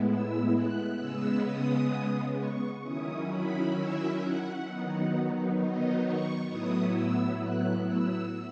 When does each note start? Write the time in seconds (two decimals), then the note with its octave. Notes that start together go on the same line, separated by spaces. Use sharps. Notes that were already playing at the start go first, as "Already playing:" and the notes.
Already playing: A2 G#3 B3 E4
0.09 E6
0.54 F#6
1.00 C#3 G#3 B3 E6
1.46 D#6
2.38 C#6
2.83 D#3 F#3 C#4 E4 D#6
3.30 B5
3.75 E5
4.21 F#5
4.67 D#3 F#3 B3 D#4
5.58 D#5
6.04 C#6
6.49 A2 F#3 B3 E4 D#6
6.95 E6
7.40 F#6
7.86 E6